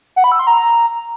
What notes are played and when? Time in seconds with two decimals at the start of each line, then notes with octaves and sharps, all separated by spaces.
0.16 F#5
0.24 B5
0.32 E6
0.39 C6
0.47 A#5